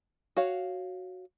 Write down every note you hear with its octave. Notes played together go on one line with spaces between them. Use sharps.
F#4 C#5 F5